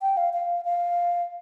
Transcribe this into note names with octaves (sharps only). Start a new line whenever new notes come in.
G5
F5
F5
F5